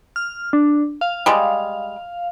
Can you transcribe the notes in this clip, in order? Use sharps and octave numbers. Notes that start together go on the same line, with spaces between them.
F6
D4
F5
G3 G#3